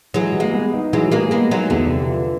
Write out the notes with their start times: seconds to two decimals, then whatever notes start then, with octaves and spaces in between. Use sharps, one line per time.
0.14 E3 F#3 G#3
0.35 G3
0.40 G#3 A#3
0.54 B3
0.74 D#4
0.93 E3 F#3 G#3
1.11 G3 G#3 A#3
1.31 G#3 A#3 B3
1.51 F#3 G#3 D#4
1.70 E2 D3 E3
1.89 C3
2.09 F3